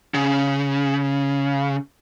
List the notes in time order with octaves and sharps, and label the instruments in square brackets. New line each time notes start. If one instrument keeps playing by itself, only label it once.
[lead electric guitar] C#3